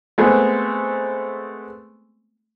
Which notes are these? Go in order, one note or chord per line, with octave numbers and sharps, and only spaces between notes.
G#3 A3 B3 C4